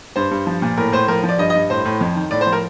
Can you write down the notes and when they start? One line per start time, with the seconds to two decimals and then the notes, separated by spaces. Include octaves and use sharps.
0.16 G2 C5
0.31 G2
0.47 F3
0.62 A#2
0.77 A2 A#4
0.92 A2 C5
1.08 F3 A#4
1.23 F3
1.29 D5
1.38 G2 D#5
1.50 D#5
1.55 G2
1.70 A2 C5
1.85 A2
2.01 F2
2.15 D#3
2.31 A2 D5
2.41 C5
2.47 F3
2.52 A#4